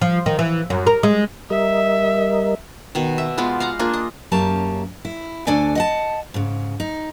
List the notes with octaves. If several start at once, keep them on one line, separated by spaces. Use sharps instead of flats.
F3
D#3
E3
F#2
A#4
G#3
G3 A#4 D#5 E5
B2 D#3
E5
G#3 B3 F4 D5
F5 F#5 A#5
A#3 D4 F4 G#4
D#5
F#2 A#3 C#4 G4 A5
E4
D2 D4 A4 D5 G#5
D#5 F#5 A5
G#2 C#3
D#4